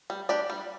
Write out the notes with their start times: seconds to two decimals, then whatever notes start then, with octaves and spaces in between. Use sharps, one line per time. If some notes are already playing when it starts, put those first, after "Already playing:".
0.10 G3
0.29 D4 G4 D5
0.50 G3